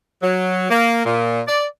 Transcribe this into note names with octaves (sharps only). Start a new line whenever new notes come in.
F#3
A#3
A#2
D5